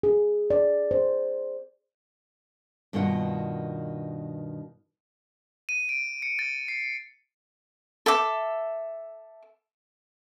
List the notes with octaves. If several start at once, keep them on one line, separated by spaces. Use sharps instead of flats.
G#4
D5
C5
G2 B2 D#3 A#3 F4 F#5
D#7
D7
C#7
A6
C7
A4 E5 D6